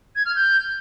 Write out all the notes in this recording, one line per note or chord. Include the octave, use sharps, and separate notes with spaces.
G#6
F6
G6